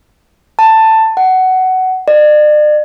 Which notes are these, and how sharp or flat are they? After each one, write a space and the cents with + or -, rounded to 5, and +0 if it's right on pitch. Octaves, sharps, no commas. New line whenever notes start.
A5 +10
F#5 +15
D5 +40